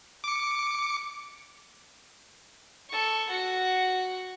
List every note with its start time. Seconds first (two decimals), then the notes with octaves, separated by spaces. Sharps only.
0.24 D6 C#7
2.89 A4 C#6
3.29 F#4 F#5